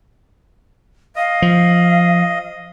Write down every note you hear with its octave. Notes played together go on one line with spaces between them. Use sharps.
D#5 F5
F3